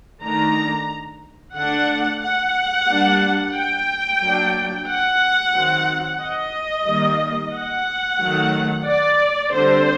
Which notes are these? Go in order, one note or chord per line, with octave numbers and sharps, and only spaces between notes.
D#3 A3 D4 A#5
D3 A3 D4 F#5
F#5
G3 A#3 D4
G5
F#3 A#3 D4
F#5
D#3 F#3 C4
D#5
D#3 G3 A#3
F#5
D#3 F#3 A3
D5
D3 G3 C4 C5